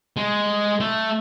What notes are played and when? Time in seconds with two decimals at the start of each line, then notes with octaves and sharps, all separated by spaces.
0.17 G#3
0.80 A3